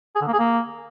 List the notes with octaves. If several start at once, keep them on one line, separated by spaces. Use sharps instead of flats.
G#4
D3
A#3
G#4
A#3